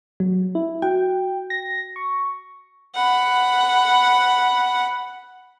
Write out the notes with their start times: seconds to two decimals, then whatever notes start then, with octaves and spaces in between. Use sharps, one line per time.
0.20 F#3
0.55 E4
0.82 F#4 G5
1.50 A#6
1.96 C#6
2.95 F#5 B5